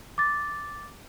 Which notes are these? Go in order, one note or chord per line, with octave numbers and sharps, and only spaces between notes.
D6 A6